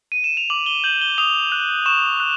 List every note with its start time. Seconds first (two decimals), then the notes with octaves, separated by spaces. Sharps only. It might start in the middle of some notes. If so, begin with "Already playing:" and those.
0.12 D#7
0.24 E7
0.37 F7
0.50 D6 F#7
0.66 G7
0.84 G6 F#7
1.01 G7
1.18 D#6 F7
1.52 F#6
1.86 C#6 E7
2.20 F#6